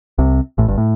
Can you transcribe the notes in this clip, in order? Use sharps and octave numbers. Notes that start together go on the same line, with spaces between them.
C2 C3
A1 A2
G1 G2
A2